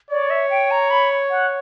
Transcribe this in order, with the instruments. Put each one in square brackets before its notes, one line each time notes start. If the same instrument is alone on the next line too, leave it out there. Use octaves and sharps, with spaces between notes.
[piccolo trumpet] C#5 [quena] D5
[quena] E5
G5
A#5
B5
F#5